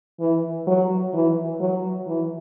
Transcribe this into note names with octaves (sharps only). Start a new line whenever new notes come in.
E3
F#3
E3
F#3
E3